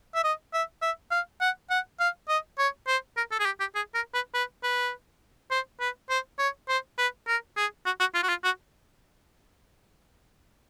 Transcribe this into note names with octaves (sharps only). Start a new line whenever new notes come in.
E5
D#5
E5
E5
F5
F#5
F#5
F5
D#5
C#5
C5
A#4
A4
G#4
G4
G4
G#4
A#4
B4
B4
B4
C5
B4
C5
C#5
C5
B4
A#4
G#4
F#4
F#4
F4
F#4
F4
F#4